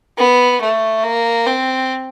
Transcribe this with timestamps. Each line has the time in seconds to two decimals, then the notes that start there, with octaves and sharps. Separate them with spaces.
0.17 B3
0.61 A3
1.04 A#3
1.47 C4